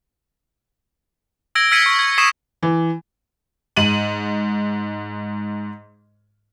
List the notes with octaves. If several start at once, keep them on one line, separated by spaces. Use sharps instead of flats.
E6 G#6 A#6 D7 G7
E6 F6 G#6 B6 C#7 D#7
C#6
G#6
C#6 D#6 G#6 B6 C7 E7
E3
G#2 D#7 F#7